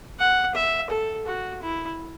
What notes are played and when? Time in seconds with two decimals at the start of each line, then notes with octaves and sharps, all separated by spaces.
0.19 F#5
0.55 E5
0.90 A4
1.27 F#4
1.62 E4